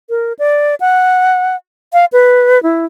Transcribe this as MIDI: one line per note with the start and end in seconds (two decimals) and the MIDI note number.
0.10 0.33 70
0.39 0.75 74
0.80 1.56 78
1.93 2.05 77
2.13 2.62 71
2.63 2.85 64